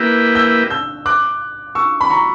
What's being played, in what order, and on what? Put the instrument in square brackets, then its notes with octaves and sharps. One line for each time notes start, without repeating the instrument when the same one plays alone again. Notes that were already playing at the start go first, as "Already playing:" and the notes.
Already playing: [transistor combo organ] A#3 E4 G4 B4 [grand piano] F#6
[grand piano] E6 G6
E6 G6
D6 F#6
C#6 E6
B5
A#5 C#6